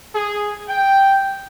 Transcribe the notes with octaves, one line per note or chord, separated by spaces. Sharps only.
G#4
G5